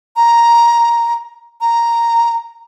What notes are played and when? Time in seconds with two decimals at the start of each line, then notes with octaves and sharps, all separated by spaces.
0.16 A#5
1.61 A#5